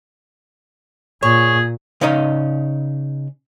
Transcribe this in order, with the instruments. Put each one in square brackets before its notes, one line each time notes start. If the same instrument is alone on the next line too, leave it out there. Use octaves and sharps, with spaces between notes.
[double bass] A#2 [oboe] G#4 [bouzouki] C#5
[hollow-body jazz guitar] C#3 C#4 D#4 D#5 A#5